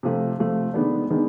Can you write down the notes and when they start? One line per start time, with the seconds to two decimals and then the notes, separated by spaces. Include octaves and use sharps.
0.03 C3 F3 A3
0.38 C3 F3 A3
0.74 D#3 G#3 B3 D4
1.10 D#3 G#3 B3 D4